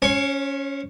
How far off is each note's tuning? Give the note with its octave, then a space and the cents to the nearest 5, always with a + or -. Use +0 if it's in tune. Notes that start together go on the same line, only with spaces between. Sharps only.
C#4 +5 C#5 -45 C#6 +25